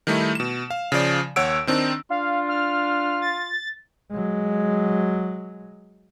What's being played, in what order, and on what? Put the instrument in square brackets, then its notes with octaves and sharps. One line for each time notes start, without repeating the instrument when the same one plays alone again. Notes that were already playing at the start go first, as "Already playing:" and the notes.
[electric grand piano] D#3 G3 A3 D#4 E4
B2 E7
F5
C#3 F3 D5
D#2 C#5 F#5 E6 D7
D#3 C4 D4 D#4
[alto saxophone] D4 [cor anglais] F4 [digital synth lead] F5
[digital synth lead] F6
A6
[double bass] F#3 G#3